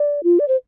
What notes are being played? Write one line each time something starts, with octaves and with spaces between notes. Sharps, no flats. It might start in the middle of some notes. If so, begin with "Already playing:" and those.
Already playing: D5
F4
D5
C5